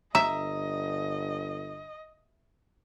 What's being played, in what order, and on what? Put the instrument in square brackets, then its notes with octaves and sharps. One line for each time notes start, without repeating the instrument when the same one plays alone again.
[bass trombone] G1 [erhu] D#5 [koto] E5 [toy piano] A#5